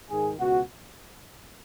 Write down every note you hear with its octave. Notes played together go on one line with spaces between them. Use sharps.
G#2 D#3 G#4
C#2 B2 F#4